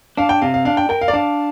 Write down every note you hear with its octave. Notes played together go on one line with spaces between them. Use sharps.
D4 F5
G5
C3 F5
F5
D4 F5
G5
A#4 G5
F5
D5
D4 F5